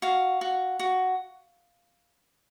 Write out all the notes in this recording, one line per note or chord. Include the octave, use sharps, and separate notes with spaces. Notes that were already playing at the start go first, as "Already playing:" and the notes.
F#4 F5
F#4
F#4